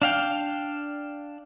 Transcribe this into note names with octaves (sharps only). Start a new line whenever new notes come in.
D4 F5 G5